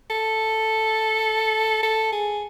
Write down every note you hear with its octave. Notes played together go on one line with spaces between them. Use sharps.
A4
A4
G#4